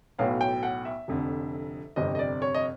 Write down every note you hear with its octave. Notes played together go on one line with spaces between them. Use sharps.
B1 A2 F#3 B3 F5
G5
F#5
E5
F1 F2 D3
G1 F2 C3 D#5
D#5
D5
C#5
D#5